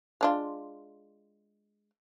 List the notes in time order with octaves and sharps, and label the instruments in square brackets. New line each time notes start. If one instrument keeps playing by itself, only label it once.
[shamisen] G#3 D4 F4